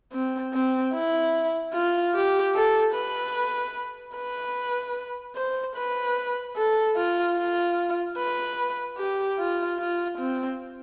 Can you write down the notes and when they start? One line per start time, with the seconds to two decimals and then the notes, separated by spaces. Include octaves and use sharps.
0.13 C4
0.54 C4
0.94 E4
1.74 F4
2.14 G4
2.55 A4
2.95 B4
4.16 B4
5.36 C5
5.76 B4
6.56 A4
6.97 F4
7.37 F4
8.18 B4
8.98 G4
9.39 F4
9.79 F4
10.18 C4